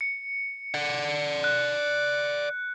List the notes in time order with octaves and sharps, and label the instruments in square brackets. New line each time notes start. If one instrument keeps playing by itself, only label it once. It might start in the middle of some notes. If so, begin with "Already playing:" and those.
[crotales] C#7
[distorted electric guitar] D5 F#5
[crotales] F#6